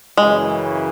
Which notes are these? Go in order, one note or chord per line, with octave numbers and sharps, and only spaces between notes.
F#2 C#3 E3 G#3